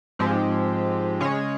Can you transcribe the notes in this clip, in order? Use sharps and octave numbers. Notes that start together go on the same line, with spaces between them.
G#2 F3 G#3 C4 G4
C#3 G#3 C#4 G#4 C#5